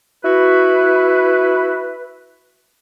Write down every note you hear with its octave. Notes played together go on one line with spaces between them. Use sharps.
E4 F#4 B4